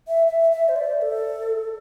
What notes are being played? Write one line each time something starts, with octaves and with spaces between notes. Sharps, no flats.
E5
E5
E5
C5
D5
A4